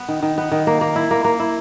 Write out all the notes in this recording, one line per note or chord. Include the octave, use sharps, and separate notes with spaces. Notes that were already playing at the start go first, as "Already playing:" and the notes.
Already playing: B3
D#3
D#3
B3
D#3
A#3
A#3
E4
A#3
A#3
E4